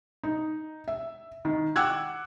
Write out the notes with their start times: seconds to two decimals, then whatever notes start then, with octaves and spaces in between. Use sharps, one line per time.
0.23 D#4
0.88 E5
1.45 D#3
1.76 F#5 G5 D6 E6 F#6 G#6